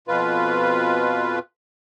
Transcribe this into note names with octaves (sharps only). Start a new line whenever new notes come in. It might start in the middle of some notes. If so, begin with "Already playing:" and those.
F2 B2 F4 B4